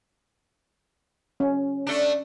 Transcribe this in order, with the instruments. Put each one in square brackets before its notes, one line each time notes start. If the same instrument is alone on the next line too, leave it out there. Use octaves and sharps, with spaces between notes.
[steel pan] C#4
[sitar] A3 D4